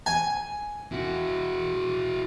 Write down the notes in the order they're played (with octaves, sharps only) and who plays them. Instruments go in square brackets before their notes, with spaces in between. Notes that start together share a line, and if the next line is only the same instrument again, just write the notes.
[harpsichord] G#5
[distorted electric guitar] E4 F#4